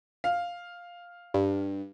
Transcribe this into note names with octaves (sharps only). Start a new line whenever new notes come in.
F5
G2